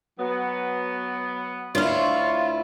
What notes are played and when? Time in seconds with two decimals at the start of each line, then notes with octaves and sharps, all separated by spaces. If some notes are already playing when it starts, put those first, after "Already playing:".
0.20 F#3 B3
1.75 D2 E4 F4 C#5